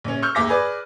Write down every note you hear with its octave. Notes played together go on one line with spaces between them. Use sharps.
A#1 C#4
C#6 E6 F6 G6
D#2 G#2 E5 D6 A#6
G#4 B4 D5